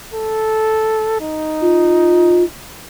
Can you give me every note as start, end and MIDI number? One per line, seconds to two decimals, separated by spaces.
0.14 1.18 69
1.20 2.46 63
1.61 2.43 65